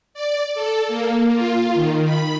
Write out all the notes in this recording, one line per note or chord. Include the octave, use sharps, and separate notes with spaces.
D5
A4
A#3
F4
D#3
B5